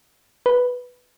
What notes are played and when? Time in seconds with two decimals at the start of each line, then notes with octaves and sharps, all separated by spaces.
0.46 B4